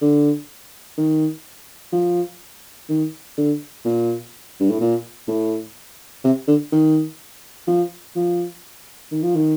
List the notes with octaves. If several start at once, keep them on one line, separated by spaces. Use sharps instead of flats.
D3
D#3
F3
D#3
D3
A#2
G2
A2
A#2
A2
C3
D3
D#3
F3
F3
D#3
F3
D#3